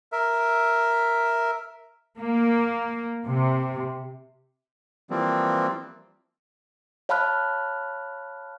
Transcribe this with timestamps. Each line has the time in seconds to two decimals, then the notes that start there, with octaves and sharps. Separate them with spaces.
0.12 A#4 E5
2.19 A#3
3.26 C3
5.10 E3 F3 G3 A#3 C4
7.09 C#5 F5 A5 B5 F6 F#6